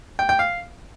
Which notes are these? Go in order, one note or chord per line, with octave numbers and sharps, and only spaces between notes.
G5
G5
F5